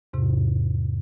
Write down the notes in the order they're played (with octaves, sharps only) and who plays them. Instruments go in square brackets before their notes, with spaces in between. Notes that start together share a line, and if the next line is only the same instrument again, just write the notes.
[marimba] E2 G#2 C3